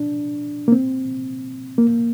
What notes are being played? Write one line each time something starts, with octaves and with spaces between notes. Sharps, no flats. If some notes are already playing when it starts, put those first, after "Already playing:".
Already playing: D4
A#3
C4
A#3